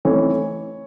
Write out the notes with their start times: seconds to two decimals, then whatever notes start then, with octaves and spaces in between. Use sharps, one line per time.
0.05 E3 A3 C4 D#4 C#5